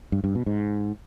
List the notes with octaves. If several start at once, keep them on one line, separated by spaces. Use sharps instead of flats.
G2
G2
B2
G#2